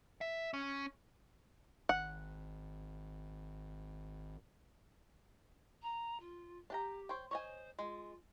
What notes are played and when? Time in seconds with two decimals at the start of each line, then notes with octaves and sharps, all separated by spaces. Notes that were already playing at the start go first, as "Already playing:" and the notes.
0.21 E5
0.54 C#4
1.89 G#1 F#5
5.82 A#5
6.20 F4
6.70 D4 G4 G5 A#5
7.09 C5 C#5 G5
7.31 C5 C#5 D#5 G#5
7.79 G#3 F4